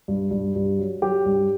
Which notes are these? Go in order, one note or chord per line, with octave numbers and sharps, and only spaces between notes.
G2
G2
G2
F#3
F#3 G4
G2